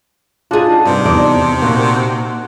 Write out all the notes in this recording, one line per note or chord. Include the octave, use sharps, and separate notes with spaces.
D4 D#4 F4 F#4 G#4
G2 C3
E2 D#4 D5
A#2 A#3 F#4